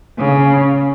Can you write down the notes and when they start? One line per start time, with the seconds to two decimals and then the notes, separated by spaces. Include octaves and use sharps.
0.19 C#3